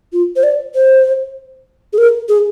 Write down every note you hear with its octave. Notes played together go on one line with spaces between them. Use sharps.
F4
C5
D5
C5
G#4
A#4
G#4